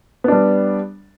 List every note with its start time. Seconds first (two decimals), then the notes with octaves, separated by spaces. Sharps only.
0.24 B3
0.28 D4
0.32 G3